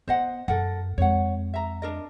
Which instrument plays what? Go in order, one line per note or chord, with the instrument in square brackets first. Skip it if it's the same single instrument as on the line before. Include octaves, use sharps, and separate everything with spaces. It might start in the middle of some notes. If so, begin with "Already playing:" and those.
[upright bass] B3 [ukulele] C5 D#5 F#5
[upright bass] F#2 [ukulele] A4 A#4 F#5
[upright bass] F2 G#3 [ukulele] C#5 F#5
[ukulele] E5 A#5
D4 A#4 D#5